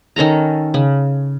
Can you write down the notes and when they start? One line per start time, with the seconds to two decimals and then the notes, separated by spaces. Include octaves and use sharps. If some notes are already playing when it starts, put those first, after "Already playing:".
0.16 D#3 C#4 A4 A#5
0.74 C#3